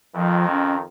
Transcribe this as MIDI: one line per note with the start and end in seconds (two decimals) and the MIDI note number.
0.15 0.83 41
0.15 0.83 51
0.15 0.49 53
0.51 0.75 61